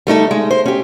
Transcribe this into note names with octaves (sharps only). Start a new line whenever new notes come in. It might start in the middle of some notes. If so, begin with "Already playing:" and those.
G3 A3 D#4 A4
G#3
C5
C#4 G4